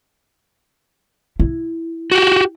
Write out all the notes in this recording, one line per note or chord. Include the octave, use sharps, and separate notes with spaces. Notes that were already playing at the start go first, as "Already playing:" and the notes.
E4
F#4 G4